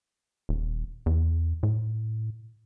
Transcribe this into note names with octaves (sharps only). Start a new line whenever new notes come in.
D#1
E2
A2